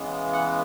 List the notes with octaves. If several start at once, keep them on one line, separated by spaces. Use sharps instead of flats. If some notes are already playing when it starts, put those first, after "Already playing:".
Already playing: C#3 E3 G#3 B3
F#5